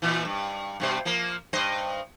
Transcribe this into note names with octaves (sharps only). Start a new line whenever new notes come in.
A#2 E3
G2
G2 B2 C5
F3 A#3
G2 C5 D#5